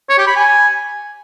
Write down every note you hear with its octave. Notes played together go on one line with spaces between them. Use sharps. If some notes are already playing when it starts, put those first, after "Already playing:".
C#5
G4
B5
G#5